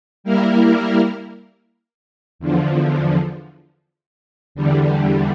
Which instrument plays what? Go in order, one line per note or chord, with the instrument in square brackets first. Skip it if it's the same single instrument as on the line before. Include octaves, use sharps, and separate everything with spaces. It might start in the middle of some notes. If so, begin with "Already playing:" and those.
[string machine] G3 A#3 E4 A#4
E2 D3 F3
E2 D3 G3